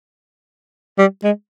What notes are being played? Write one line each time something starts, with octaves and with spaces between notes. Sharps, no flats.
G3
G#3